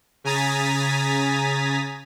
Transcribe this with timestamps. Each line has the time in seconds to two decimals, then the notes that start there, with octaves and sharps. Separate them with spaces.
0.24 C#3 G#5 A#5 D#6 A6 B6